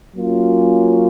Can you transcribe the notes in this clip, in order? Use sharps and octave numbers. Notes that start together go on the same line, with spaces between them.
F#3 A#3 C#4 F4